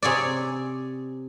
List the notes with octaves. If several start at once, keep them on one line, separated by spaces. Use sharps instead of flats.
C3 G#4 C#5 D5